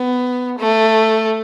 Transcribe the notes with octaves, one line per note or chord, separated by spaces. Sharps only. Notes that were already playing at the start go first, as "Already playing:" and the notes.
Already playing: B3
A3